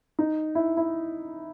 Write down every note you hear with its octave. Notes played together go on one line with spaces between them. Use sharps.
D#4
E4
E4